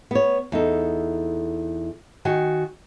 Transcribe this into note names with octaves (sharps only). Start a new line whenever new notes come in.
B3 C#5
E2 D#4 A4
D#3 F#4 G#5